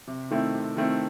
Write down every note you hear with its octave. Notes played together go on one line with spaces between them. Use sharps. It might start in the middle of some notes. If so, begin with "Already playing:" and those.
C3
D#3 A3 C4 E4
C3
D#3 A3 C4 E4